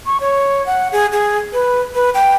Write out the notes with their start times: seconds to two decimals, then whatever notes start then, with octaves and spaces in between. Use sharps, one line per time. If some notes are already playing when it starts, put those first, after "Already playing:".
0.06 C#6
0.20 C#5
0.66 F#5
0.92 G#4
1.12 G#4
1.53 B4
1.95 B4
2.14 G5